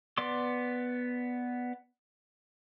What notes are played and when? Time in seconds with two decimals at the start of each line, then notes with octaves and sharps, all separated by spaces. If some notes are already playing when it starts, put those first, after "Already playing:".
0.17 B3 D5 C6 D6